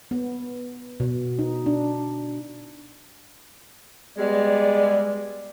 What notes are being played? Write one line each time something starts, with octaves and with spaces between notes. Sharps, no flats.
B3
B2
D#4
D4
G3 G#3 B3 D5